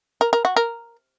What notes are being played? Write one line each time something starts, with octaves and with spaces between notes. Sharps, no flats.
A#4
A#4
F#4
A#4